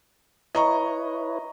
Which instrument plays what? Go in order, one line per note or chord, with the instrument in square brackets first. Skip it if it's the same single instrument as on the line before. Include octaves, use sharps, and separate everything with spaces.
[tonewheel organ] E4 B4 C#5 [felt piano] D#5 A#5 C#6